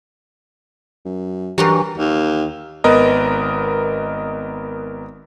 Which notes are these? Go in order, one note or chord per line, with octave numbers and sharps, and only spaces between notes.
F#2
G2 E3 F#3 F#4 G4 A#4
D#2
G#1 B3 A#4 B4 D#5